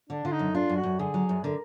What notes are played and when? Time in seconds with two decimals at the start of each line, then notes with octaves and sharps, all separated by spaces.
0.10 D3 D4
0.25 D3 F4
0.32 D#4
0.39 F#2
0.54 D4 F4
0.69 F#2
0.76 F#4
0.83 F#2
0.99 D3 G#4
1.14 F#3
1.29 F#2
1.44 D3 A#4